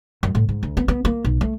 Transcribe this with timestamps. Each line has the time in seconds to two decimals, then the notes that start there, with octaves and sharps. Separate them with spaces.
0.23 F#2
0.35 A2
0.49 G#2
0.63 D2
0.77 B3
0.88 B3
1.05 A#3
1.25 B1
1.41 A3